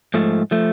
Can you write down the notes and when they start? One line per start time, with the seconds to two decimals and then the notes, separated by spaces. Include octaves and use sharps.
0.14 G#2 F3 A3
0.51 F3 A3